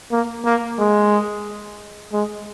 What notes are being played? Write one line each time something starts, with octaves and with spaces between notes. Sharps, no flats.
A#3
A#3
G#3
G#3